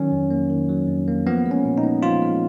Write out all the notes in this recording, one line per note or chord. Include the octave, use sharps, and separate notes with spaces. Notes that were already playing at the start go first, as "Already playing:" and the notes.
Already playing: D#3 F#3 C#4
F2
A#3
D#3
F#3
F2
A#3
F3 B3
G#3
C#4
A#2
D#4
B3
F3 F4
G#3